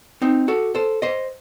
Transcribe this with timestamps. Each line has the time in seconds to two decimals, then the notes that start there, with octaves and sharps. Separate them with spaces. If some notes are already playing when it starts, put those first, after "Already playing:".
0.22 C4 D#4
0.48 F#4 A4
0.75 A4 C5
1.02 C5 D#5